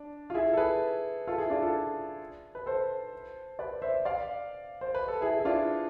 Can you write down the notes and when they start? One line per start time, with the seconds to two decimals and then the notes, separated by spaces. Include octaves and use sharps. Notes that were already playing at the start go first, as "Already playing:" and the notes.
Already playing: D4
0.30 F4
0.34 E4 G#4
0.53 A4
0.57 G#4 B4
1.27 F4 A4
1.38 E4 G#4
1.50 D4 F4
1.62 F4 A4
2.55 B4
2.66 A4 C5
3.59 B4 D5
3.82 C5 E5
4.05 D5 F5
4.81 C5
4.95 B4
5.08 A4
5.21 E4 G#4
5.39 E4
5.45 D4 F4